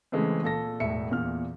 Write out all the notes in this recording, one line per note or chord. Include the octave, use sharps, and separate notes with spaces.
C#3 E3 G#3 A3 C4
A#2 A4 A#6
E1 A2 E5 C#7
E2 A#2 F6